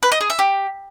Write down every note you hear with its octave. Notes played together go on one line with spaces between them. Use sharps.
B4
D#5
G#4
E5
G4